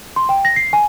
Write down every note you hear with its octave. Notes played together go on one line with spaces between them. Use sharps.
C6
G5
A#6
C7
G#5